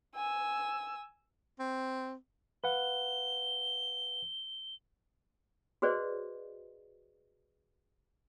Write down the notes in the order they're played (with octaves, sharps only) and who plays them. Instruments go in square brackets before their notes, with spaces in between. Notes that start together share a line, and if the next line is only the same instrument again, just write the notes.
[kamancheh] G#5 E6
[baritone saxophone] C4
[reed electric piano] B4 F5 F#5 [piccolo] G7
[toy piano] F#4 G#4 B4 C5 D5 D#5